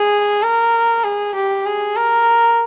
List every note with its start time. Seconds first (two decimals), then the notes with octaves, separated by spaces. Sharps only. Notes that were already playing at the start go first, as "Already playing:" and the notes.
Already playing: G#4
0.42 A#4
1.03 G#4
1.35 G4
1.66 G#4
1.96 A#4